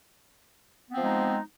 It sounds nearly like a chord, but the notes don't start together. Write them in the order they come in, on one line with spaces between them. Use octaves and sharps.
B3 C4 F3 G#3 D#4